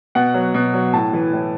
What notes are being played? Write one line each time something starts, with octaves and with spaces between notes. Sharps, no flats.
B2 F#5
F#3
B2
F#3
A2 A5
E3
A2